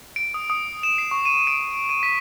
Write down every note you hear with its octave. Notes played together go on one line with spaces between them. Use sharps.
D7
D#6
D#6
E7
C7
C#6
D#7
D7
D#7
B6